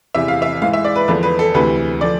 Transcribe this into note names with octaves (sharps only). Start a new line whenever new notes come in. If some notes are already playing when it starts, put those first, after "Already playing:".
E2 C3 E3 E5
F5
E5
G#2 E3 F5
E5
D5
B4
E2 D3 F3 B4
B4
A4
D2 C3 E3 B4
D3 F3 D5